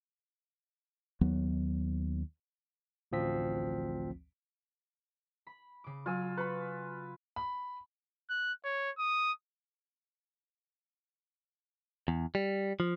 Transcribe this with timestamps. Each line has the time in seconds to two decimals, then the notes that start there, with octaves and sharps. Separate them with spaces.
1.21 D#2 F#3 B3
3.12 A1 D2 F3 C4 B6
5.47 B5
5.84 C#3 D6
6.06 F#3 F4 G#5 E6
6.37 B4 B5 C#6
7.36 B5
8.30 F#6
8.65 C#5
8.98 D#6
12.08 E2
12.35 G3
12.80 F3